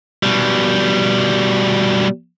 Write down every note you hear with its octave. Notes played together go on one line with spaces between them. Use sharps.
B2 G3